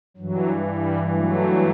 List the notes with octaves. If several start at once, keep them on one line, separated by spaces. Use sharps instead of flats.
G2 E3 F#3
G3
F#3 A3